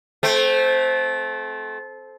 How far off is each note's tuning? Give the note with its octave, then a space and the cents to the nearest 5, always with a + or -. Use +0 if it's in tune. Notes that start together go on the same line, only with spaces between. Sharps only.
A3 -25 C4 +0